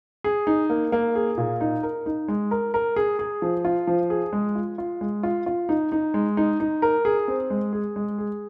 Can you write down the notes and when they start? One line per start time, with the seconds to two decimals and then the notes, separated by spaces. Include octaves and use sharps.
0.24 G#4
0.47 D#4
0.70 A#3
0.92 A#3
1.15 G#4
1.38 A#2
1.61 D#4
1.83 A#4
2.06 D#4
2.28 G#3
2.51 A#4
2.74 A#4
2.96 G#4
3.19 G#4
3.42 F3
3.65 F4
3.87 F3
4.10 G#4
4.33 G#3
4.55 F4
4.78 F4
5.01 G#3
5.23 F4
5.46 F4
5.69 D#4
5.92 D#4
6.14 G#3
6.37 D#4
6.60 D#4
6.82 A#4
7.05 G#4
7.28 C4
7.50 G#3
7.73 G#4
7.96 G#3
8.18 G#4